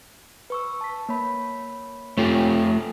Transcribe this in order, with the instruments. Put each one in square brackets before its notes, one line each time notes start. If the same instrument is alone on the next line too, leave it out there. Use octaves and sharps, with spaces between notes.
[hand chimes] B4 C#6 E6
A5 B6
A#3 C#5 B5
[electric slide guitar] A3 F4 G4 [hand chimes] C4 A4 C#5
[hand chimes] A4